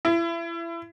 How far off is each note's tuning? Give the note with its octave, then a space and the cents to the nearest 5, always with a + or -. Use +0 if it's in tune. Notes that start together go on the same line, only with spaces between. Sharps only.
E4 +30